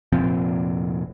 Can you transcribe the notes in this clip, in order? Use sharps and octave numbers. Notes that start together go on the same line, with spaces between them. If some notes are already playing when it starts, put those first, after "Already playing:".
F1 A#2 F3 C4